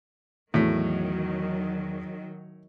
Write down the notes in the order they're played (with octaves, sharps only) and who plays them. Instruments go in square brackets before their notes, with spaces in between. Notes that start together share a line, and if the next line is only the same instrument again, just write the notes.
[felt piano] E2 F#4 B6 [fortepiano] A2 [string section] D#3 F#3